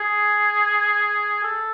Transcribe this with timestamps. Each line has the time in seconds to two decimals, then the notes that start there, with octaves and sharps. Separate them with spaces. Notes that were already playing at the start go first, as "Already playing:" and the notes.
Already playing: G#4
1.44 A4